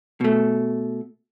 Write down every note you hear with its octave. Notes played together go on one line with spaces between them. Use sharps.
B2 A3